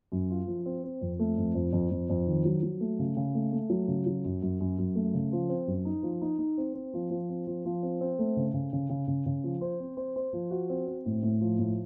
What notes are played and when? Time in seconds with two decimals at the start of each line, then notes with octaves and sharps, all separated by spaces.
0.12 F#2
0.30 F4
0.47 F3
0.66 C4
0.84 C4
1.01 F2
1.19 A3
1.38 F2
1.55 F2
1.73 F2
1.91 F2
2.10 F2
2.27 D#3
2.45 F#3
2.63 F#3
2.80 A3
2.99 C#3
3.17 C#3
3.35 A3
3.53 A3
3.70 F#3
3.88 C#3
4.06 F#3
4.25 F#2
4.42 F#2
4.60 F#2
4.78 F#2
4.95 A3
5.14 C#3
5.32 F3
5.49 C4
5.67 F#2
5.85 D#4
6.03 F3
6.22 D#4
6.39 D#4
6.58 C4
6.74 C4
6.93 F3
7.10 F3
7.29 C4
7.47 F3
7.65 F3
7.83 C4
8.01 C4
8.19 A3
8.36 C#3
8.54 C#3
8.73 C#3
8.90 C#3
9.07 C#3
9.26 C#3
9.43 F3
9.61 C5
9.80 C4
9.97 C5
10.16 C5
10.33 F3
10.51 F#4
10.70 C4
10.87 C4
11.06 A2
11.23 A2
11.41 F3
11.59 A2